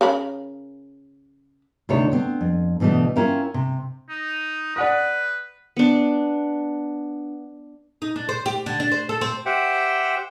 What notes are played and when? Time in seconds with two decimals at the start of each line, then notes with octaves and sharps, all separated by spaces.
0.01 C#3 A#4 B5
1.89 D2 C3 D#4 E4 A4 C#5
2.12 B3 C4
2.41 F2
2.80 D2 B2 E3 A3 D#5
3.16 C#4 E4 F4 A#4 E5 G5
3.54 C3
4.09 D#4
4.76 B4 D5 F#5 D#6
5.77 B3 D4
8.02 D#4
8.16 D4
8.29 C5
8.46 G4
8.66 D3
8.80 D4
8.92 C5
9.09 A4
9.21 C4
9.46 G4 C5 E5 F#5 G5